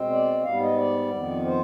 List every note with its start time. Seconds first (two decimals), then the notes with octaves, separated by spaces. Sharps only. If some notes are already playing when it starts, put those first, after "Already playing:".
Already playing: B2 G#3 C4
0.10 D5
0.43 G#2 G3 B3 F5
0.60 D#5
0.77 D5
1.11 F2 D#3 B3
1.45 C5